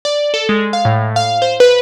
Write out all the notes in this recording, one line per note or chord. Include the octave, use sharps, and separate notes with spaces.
D5
A4
G#3
F5
A2
F5
C5
B4